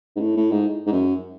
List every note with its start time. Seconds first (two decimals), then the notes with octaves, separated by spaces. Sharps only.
0.16 G#2
0.20 A2
0.37 A2
0.51 G#2
0.86 G#2
0.92 F#2